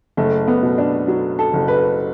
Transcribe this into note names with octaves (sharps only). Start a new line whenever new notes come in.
F#1 A3
B3
B2
D4
F#3
A4
F#1
B4